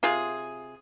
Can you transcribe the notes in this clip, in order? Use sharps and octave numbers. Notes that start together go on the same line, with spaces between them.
C3 F4 G#4